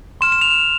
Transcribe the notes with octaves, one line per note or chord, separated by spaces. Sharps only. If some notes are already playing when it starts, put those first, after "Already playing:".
C6 F6 E7
E7
F7